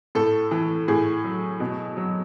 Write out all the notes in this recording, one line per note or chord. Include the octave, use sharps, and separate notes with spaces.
A2 A4
E3
A2 G#4
F#3
B2
F#3